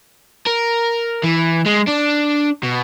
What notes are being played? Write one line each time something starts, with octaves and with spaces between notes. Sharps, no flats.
A#4
E3
G#3
D4
B2